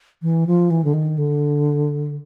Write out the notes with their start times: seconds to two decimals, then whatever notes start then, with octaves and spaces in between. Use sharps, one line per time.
0.22 E3
0.47 F3
0.70 E3
0.84 D3
0.94 D#3
1.18 D3